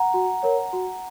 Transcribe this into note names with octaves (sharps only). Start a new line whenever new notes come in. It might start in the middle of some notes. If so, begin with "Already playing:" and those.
Already playing: F#5 A#5
F#4
A#4 C#5
F#4